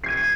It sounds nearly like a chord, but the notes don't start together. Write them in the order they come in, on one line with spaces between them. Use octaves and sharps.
C7 G#6 D#7